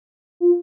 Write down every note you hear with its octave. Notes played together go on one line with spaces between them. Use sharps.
F4